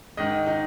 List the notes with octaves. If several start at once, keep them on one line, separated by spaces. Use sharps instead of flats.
G#2 D#3 D#5
D#4